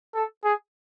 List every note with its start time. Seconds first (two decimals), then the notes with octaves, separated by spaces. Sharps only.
0.15 A4
0.44 G#4